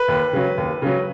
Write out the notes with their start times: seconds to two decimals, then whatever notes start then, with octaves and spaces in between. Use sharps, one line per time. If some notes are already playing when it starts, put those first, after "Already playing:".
Already playing: B4
0.08 D#2
0.33 C#3 F#3
0.58 D#2
0.82 C#3 F#3